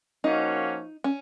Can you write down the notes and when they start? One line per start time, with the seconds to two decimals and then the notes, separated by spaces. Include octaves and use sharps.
0.24 F3 A#3 C#4 D#4 F#4
1.04 C#4